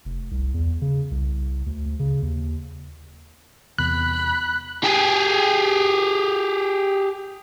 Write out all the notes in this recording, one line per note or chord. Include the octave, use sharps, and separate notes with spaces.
F1
C2
E2
C#3
C2
D2
D2
C#3
D#2
E2 C3 B5 F#6
G4 G#4